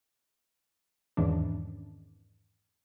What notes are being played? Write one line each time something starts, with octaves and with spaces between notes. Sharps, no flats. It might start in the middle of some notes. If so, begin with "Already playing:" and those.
E2 G#2 D#3 E3 C#4 D4